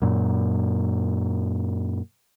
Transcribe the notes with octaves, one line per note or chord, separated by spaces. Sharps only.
F#2 A#2